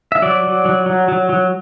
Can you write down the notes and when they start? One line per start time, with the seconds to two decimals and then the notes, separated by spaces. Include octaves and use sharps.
0.12 E5
0.22 F#3 D5
0.44 F#3
0.65 F#3
0.86 F#3
1.08 F#3
1.29 F#3